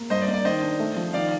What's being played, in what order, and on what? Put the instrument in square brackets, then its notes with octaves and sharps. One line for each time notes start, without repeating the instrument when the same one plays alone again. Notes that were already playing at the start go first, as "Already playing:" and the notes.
Already playing: [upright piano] A#3
[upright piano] G2 [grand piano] C5 D#5
[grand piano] D5
[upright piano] A#3
[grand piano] D5
[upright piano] D#3 [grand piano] C5 D#5
[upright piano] D4
A3
F3
[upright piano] D#3 [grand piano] D5 F5